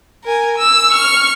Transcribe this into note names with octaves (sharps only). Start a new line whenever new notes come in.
A#4 G#5
E6
C#6 F6